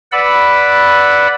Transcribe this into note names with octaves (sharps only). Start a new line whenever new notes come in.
B4 D5 F#5 B5 E6